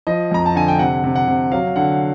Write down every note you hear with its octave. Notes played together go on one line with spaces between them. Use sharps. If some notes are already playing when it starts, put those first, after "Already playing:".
F3 D#5
F2 A#5
A5
D3 G#5
G5
C3 F#5
C3
F#5
C3
F#3 F5
D3 F#5